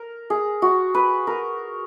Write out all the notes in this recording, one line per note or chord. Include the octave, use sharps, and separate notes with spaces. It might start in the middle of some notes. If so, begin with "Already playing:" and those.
Already playing: A#4
G#4
F#4
B4
A#4